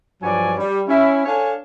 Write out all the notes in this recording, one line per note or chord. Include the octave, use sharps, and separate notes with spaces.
G2 F3 F#3 C#5 D5 G#5
G3
C#4 E4
D4 A4 C#5 F5 G#5